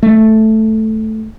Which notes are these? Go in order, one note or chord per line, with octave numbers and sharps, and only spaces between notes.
A3